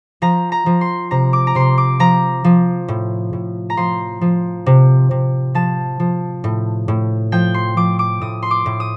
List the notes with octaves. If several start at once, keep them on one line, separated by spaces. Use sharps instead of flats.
F3 A#5
A#5
F3
C6
C3 A#5
D6
A#5
C3 C6
D6
F3 A#5
F3
A2
A2
A#5
F3 C6
F3
C3
C3
F3 A5
F3
A2
A2
F3 G5
C6
F3 D6
D6
A2 D#6
C6
D6
A2
D#6